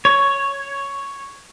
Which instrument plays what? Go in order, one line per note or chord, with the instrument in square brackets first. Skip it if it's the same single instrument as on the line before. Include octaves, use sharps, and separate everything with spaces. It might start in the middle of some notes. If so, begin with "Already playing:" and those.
[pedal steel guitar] C#5